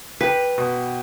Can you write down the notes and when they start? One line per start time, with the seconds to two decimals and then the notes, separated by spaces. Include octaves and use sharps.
0.21 G4 B4
0.58 B2